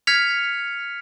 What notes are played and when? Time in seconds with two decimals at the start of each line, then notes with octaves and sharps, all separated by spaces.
0.07 F6 G#6 B6 C#7 F7